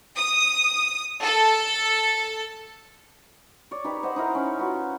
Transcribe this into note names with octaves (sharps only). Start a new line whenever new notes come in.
D#6
A4
C#5 D5
D#4 G4 B4 C#5
C5 D#5 F#5
D#4 E4 A#4 A#5
C#4
F4 F#4 B4